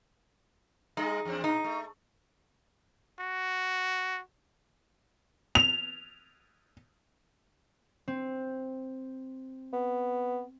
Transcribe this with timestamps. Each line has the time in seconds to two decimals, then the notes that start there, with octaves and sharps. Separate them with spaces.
0.97 G3 D#4 G#4 D#5
1.25 E2 C4 D4
1.44 A#2 D#4
1.64 A3
3.20 F#4
5.55 F7
8.08 C4
9.73 B3